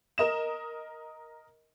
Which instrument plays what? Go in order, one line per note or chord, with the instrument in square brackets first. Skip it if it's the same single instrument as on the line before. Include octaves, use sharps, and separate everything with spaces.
[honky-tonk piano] A#4 D#5 E7